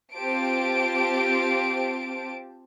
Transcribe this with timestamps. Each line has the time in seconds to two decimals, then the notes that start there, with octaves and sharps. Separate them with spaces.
0.14 C4 F4 G4 C5 A5 D7